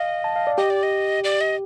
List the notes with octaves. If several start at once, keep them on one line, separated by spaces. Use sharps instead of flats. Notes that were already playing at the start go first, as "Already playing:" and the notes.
Already playing: D#5 F5
A5
F5
D5
G4 D#5
D5
D#5
D5
D#5